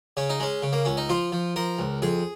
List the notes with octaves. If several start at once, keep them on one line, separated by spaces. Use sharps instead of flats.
C#3 C#4
D#4
G#3 C#4
C#3
A#3
C#2 C#4
D#4
F3 F4
F3
F3 A#4
C#2
F2 G#4